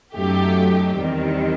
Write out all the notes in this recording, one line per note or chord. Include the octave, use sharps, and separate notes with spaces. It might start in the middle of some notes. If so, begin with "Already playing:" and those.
F#2 F#3 A3 D#4 G4
E2 D#3 G3 C4